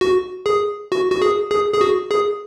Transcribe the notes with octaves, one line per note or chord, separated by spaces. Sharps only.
F#4
G#4
F#4
F#4
G#4
G#4
G#4
F#4
G#4